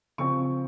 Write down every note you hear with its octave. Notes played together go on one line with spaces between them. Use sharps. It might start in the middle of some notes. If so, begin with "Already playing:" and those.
C#3 F3 C4 C#6